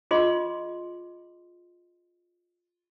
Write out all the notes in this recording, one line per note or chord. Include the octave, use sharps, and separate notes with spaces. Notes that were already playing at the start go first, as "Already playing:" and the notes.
F4 G#4 D#5 C6